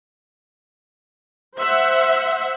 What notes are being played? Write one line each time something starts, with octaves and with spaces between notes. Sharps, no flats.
C5 E5 F#5